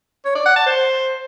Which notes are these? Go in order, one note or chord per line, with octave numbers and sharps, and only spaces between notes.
C#5
D5
F#5
A5
C5